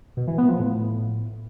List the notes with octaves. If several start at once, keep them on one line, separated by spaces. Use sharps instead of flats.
B2
E3
B3
F3
A2